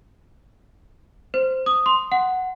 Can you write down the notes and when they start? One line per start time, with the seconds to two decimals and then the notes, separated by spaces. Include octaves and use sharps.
1.34 C5
1.66 D#6
1.86 C6
2.12 F#5